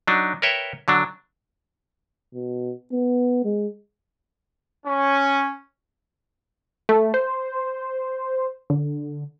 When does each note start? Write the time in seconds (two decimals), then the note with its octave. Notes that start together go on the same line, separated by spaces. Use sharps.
0.08 F#3 D4 D#4
0.42 A#4 B4 C#5 E5 G5
0.88 D3 F#3 D4
2.34 B2
2.92 B3
3.45 G#3
4.86 C#4
6.89 A3
7.14 C5
8.70 D3